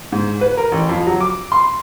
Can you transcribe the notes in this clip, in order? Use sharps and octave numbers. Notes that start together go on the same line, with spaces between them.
G#2
B4
A#4
A1
F2
F#3
D6
C6